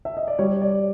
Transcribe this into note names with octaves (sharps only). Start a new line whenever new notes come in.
E5
D#5
D5
G3 C#5
C#5
D5